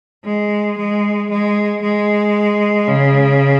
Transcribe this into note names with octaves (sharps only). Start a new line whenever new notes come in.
G#3
G#3
G#3
G#3
C#3